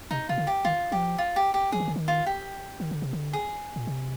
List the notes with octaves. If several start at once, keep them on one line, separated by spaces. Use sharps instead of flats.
C3 D#4
C3 F4
D3
G4
D#3 F4
F3 G4
F4
G4
G4
F3 G#4
D#3
D3
D#3
F4
G4
D#3
D3
C3
D3
G#4
A#2
C3